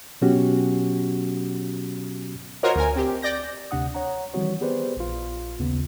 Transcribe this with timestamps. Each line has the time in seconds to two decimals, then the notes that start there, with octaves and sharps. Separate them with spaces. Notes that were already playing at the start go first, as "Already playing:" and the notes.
0.22 B2 F#3 B3 C#4 F#4 G4
2.63 F4 F#4 A#4 C5 C#5 D#5
2.76 D2 A#4 G#5
2.96 C4 G4
3.22 D5 G6 A#6
3.71 D2 C3 D4 F#5 D#6
3.95 C#5 F#5 A#5
4.34 D#3 E3 G3 C4 F#4 C#5
4.61 B3 G4 G#4 B4 C5 D5
4.97 A#1 F4
5.60 D#2 C#3 B3